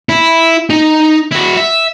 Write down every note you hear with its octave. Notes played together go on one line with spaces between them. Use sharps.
E4
D#4
E4 F#4
E5